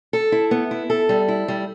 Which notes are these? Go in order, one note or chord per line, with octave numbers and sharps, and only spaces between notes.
A4
E4
B3
E4
A4
G3
E4
G3